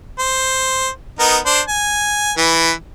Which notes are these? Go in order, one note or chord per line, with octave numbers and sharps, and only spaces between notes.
C5
B3 D#4 A#4
D4 C5
G#5
E3 B4